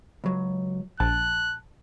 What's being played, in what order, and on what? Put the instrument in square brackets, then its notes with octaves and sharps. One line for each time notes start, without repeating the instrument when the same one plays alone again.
[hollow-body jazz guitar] C#2 F#3
[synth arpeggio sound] A#1 [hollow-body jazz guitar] A5 [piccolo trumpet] F#6